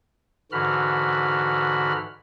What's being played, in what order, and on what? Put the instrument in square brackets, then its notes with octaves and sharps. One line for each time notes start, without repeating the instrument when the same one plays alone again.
[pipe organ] G#2 D3 E3 F#4 B5 F6